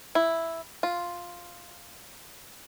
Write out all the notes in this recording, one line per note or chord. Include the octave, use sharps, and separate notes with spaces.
E4
F4